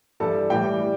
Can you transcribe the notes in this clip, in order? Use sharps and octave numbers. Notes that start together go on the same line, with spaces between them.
G2 E3 G3 A4 A5
A2 E3 G3 G4 G5
G3